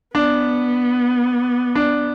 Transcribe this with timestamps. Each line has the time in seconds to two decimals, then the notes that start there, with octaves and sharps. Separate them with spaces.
0.14 B3 D4
1.75 D4